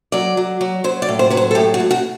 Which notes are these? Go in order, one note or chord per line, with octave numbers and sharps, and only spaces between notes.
F#3 D5
F#3
F#3
F#3 C5
D5
A2
C5
F#3 B4
C5
A4
A2 G4
F#4
A2
F#4